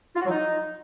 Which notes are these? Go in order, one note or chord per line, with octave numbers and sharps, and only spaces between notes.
F4
F#4
F#3
D#4